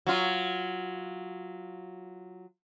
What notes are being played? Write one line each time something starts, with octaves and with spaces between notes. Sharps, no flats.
F#3 F4